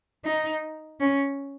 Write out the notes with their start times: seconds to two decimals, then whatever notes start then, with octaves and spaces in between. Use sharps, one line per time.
0.24 D#4
1.00 C#4